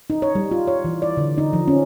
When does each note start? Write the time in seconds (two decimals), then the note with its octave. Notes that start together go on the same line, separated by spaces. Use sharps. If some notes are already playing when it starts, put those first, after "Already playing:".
0.10 D#4
0.22 C#5
0.35 G3
0.51 F4
0.67 C#5
0.84 E3
1.02 D5
1.17 D3
1.38 D#4
1.53 F3
1.68 C#4